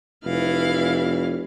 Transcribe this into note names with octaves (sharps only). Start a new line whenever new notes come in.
F1 E3 F5